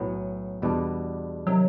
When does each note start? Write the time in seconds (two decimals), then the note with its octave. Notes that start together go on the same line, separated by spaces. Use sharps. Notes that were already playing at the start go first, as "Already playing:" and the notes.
Already playing: B1 A2 F#3 B3
0.62 E2 B2 G3 B3 D4
1.47 C3 D#3 F#3